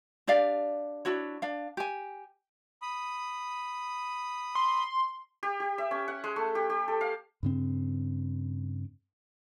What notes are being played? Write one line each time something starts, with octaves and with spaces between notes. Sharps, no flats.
D4 G4 D5 F5
D4 E4 F#4 C#5
D4 F5
G4 G#5
B5 D#6
C6
G4
G4
E5
C#4
F#5
G#3
A3
G4
G4
A4
F5
G2 C#3 C4